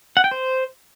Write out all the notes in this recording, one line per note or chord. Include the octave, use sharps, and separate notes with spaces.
F#5
G5
C5